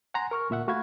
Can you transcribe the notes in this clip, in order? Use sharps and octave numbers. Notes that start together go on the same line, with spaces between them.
F#5 G#5 A#5 C6
A#4 C#6 F6
D2 A#2 E5 F#5
A3 F#4 F5 B5 G#6